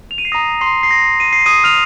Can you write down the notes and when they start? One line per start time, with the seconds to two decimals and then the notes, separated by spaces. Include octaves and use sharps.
0.11 F7
0.18 D#7
0.25 C7
0.32 A#5 D#6 A#6
0.61 C6 C7
0.83 C7
0.91 A#6
1.20 D#7
1.33 C7
1.46 D#6 D#7
1.64 F6 F7